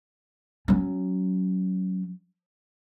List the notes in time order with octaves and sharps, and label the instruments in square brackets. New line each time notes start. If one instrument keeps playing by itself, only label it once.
[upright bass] F#3 C#4